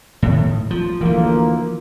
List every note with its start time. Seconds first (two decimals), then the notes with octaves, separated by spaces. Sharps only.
0.22 A2 D#3
0.71 F3
1.01 D2 E3 F3 A#3